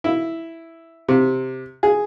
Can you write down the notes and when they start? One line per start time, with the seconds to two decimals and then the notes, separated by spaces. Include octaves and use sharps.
0.04 E4
1.09 C3
1.83 G#4